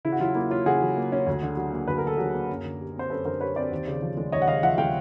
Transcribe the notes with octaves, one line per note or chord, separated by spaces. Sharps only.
C#3 E4
F#4
F#3 F4
A#3 E4
C#4 F4
C#3 F#4 G#4
F#3
A#3
C#4
D2
D3
F#3
A#3
D2 B4
A#4
D3 A4
F#3 G#4 A#4
A#3
F#2
D3
G3
C4 C5
F#2 A4 B4
D3 A#4 C5
G3 B4 C#5
C4 C5 D5
D#2
C#3
F3
G#3
D#2 C#5 D#5
F#5
C#3 D#5 F5
F3 E5 F#5
G#3 F5 G5